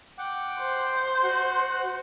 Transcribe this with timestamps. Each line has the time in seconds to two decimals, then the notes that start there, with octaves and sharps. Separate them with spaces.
0.18 F#5 G5 D6
0.59 C5
1.23 F#4 F#5